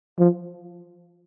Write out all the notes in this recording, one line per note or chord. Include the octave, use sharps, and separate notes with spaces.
F3